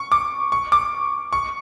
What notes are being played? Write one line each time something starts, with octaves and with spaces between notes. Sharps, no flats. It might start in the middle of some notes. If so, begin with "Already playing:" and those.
Already playing: C#6
D6
C#6
D6
C#6